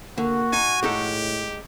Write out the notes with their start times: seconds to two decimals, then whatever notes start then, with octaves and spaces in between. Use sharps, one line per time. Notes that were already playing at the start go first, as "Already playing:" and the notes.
0.18 D3 A#3 F#4
0.53 D#4 G#5
0.83 A2 G#3 D#4 G4 A4